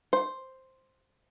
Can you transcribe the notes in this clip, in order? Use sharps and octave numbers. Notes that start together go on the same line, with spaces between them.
C5